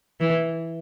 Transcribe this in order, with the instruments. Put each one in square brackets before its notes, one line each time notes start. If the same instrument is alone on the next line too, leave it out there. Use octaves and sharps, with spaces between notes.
[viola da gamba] E3